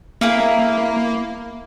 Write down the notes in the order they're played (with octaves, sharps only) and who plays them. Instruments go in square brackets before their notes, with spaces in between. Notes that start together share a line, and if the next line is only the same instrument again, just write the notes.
[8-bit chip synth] A#3 [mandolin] E4 [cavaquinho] G#4 A#4 F5